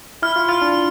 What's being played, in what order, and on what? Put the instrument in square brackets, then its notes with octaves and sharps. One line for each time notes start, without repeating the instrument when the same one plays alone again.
[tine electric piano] E4 [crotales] F6
[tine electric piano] F4
[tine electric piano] F4 [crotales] F6
[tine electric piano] D4